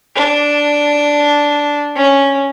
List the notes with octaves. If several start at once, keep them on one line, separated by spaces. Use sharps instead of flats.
D4
C#4